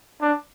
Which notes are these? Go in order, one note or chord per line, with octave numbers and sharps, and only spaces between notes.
D4